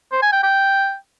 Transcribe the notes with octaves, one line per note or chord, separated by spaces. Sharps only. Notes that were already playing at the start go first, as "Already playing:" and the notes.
C5
G#5
G5
G5